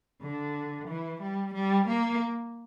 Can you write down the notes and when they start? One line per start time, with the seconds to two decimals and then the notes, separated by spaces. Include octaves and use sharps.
0.21 D3
0.88 E3
1.21 G3
1.54 G3
1.87 A#3